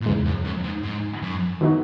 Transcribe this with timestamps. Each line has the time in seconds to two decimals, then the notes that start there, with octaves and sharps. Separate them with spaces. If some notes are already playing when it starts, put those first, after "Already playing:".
0.01 A#2
0.06 E2 G#2 C#3 G#3
0.26 F#2
0.45 F#2
0.64 G#2
0.83 G#2
1.22 F#2
1.61 D#3 F#3 B3 D#4 F#4